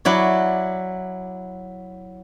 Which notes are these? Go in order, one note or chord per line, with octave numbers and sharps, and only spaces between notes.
F#3 E4 D5